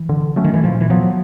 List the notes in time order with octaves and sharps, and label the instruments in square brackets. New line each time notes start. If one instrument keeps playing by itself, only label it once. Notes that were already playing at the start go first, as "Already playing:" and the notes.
Already playing: [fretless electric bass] E3
[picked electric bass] D3
F#3 A3 C#4
[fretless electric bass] D#3
E3
[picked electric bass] A#2 [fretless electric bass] F3
[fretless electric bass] E3
[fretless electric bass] F3 [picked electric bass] F#3 B3